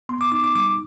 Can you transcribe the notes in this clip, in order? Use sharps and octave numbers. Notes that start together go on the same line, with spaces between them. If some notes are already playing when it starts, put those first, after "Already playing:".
B3 C6
D6
D#4 D6
D6
G3 D6